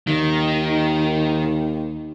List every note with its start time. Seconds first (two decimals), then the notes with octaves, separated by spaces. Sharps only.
0.07 D#2 D#3